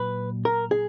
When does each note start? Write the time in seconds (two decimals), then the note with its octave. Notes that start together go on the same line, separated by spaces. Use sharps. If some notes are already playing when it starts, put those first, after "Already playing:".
Already playing: A#2 F#3 B4
0.45 A#4
0.71 G#4